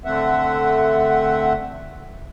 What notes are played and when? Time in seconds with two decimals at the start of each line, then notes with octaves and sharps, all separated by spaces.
0.05 D3 A3 C4 E5 F#5